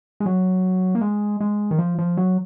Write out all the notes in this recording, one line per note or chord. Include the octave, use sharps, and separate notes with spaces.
G#3
F#3
A#3
G#3
G#3
D#3
F3
F3
F#3